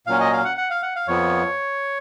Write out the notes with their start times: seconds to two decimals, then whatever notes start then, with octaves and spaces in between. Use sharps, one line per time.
0.07 A#2 F#3 C#4 F5
0.20 D#5
0.33 F5
0.45 F#5
0.57 F#5
0.70 F5
0.82 F#5
0.96 F5
1.07 F2 F3 B3 C#5